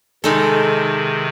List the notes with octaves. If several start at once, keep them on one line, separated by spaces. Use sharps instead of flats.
C3 D#3 G#3 D#4 A4